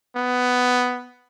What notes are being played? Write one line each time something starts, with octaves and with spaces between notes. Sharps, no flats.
B3